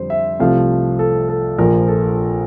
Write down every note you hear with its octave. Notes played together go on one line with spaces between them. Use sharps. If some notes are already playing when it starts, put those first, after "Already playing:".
Already playing: F2 D3 G3 C5
E5
C2 C3 F3 A3 F5
A4
A4
A#1 A#2 F3 A#4
A4